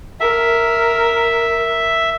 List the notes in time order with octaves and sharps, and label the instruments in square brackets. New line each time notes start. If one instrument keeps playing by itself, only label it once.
[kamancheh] A#4 [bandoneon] E5